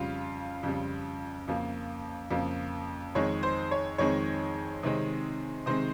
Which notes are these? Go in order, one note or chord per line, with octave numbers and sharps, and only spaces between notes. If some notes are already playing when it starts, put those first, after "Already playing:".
Already playing: F2 C#3 G3 F4 F5
F2 C#3 G3
F2 C#3 F3 A#3
F2 C#3 F3 A#3
F2 D#3 G#3 C4 C#5
C5
C#5
F2 D#3 G#3 C4 C#5
C3 D#3 G#3 C4
C3 D#3 G#3 C4 C5